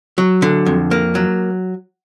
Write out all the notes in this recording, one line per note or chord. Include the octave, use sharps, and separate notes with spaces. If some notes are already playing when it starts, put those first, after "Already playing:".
F#3
D3
F2
A#3
F#3